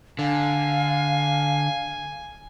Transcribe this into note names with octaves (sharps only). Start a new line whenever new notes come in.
D3 F5 G#5